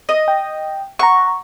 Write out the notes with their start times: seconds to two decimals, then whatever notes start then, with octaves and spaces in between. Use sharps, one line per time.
0.09 D#5
0.28 G5
0.99 F#5 A#5 C#6